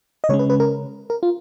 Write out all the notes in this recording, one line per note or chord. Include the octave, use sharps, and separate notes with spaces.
D#5
C#3 G#3 C#4 C#5
B4
B4
A#4
A#4
F4